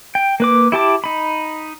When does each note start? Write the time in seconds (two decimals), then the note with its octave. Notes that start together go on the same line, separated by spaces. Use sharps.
0.15 G5
0.40 A#3 B4 D6
0.72 E4 G4 A5 D6
1.04 D#4 B5